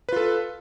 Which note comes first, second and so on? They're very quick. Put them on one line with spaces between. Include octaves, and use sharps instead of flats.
B4 F4 A4